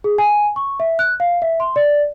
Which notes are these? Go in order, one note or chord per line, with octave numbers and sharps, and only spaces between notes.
G#4
G#5
C#6
E5
F#6
F5
E5
C6
D5